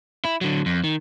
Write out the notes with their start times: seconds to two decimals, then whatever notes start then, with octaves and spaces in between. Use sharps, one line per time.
0.25 E4
0.41 D3 F#3
0.66 F2
0.84 D#3